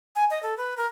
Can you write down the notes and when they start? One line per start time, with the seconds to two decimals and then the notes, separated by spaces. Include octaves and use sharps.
0.16 G#5
0.30 D#5
0.43 A4
0.57 B4
0.77 A#4